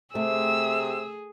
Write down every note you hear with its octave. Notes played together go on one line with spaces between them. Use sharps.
C3 A3 G#4 E6